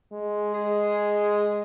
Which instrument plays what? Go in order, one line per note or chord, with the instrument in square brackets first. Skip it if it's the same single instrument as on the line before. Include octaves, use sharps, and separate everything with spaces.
[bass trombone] G#3
[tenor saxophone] G#4